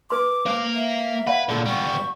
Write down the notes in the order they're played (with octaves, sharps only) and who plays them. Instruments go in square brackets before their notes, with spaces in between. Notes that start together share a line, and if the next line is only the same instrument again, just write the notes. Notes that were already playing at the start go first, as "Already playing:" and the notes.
[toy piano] B4 C6 [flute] D6
[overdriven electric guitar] A#3 F5 [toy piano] C5
[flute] E5
[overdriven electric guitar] B4 [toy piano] D5 F5 F#5
[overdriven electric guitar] A#2 D3 [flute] A4
[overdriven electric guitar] G3 B3 [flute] C#6